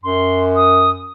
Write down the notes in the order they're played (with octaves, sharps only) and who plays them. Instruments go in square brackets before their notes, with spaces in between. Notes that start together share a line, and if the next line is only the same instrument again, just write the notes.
[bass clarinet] F#2 [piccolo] C6
[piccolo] D#6